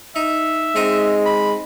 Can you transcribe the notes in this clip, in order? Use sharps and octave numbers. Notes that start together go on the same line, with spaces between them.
D#4 E5
G#3 C4 D#4 D#5
B5